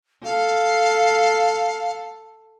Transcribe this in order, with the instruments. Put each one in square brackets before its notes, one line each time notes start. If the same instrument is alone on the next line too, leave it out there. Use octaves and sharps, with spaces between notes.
[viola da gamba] A4 [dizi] F5